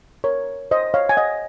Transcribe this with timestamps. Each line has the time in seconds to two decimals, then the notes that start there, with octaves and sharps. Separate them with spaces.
0.24 A#4 C#5
0.71 C5 D#5
0.94 C#5 F5
1.09 G#5
1.17 D#5 F#5